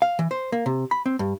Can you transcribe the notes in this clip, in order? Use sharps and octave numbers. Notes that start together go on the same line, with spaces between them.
F5
E3
C5
A#3
C3
B5
C4
G2